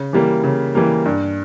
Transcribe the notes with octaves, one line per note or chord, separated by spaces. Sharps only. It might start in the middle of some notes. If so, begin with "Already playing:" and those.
Already playing: C#3
E3 G3 A#3
C#3
E3 G3 A#3
G2